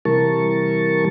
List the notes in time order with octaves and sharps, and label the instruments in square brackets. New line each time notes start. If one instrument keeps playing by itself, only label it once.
[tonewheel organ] C3 E3 G3 A#4 A5 C#6